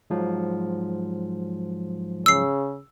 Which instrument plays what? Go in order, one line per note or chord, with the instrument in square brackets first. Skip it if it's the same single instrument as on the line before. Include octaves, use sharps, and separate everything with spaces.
[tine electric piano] G#2 F3 F#3
[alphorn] C#3 [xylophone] E6 C7